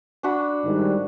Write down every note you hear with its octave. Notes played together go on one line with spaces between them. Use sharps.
D4 F#4 B5
G#2 D#3 G3